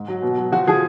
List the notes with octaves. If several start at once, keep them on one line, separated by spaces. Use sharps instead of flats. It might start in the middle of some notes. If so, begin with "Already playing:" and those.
Already playing: G#2
F#3
B2
F#3
F3 F#4
F3 G#4